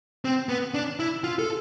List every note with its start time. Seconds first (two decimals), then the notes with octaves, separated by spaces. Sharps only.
0.25 C4
0.49 B3
0.74 D4
0.99 E4
1.24 F4
1.39 A4